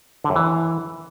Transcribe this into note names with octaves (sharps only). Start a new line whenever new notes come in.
D3
F#2
E3